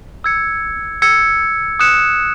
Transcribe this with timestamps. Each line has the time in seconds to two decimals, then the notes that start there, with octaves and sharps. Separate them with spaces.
0.24 E6 G#6 C#7
1.02 E6 G#6 C#7
1.80 D#6 F#6 C#7 E7